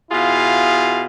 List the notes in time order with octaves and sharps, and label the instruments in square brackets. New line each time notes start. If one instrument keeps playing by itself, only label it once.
[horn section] B2 E4 F4 G#4 F5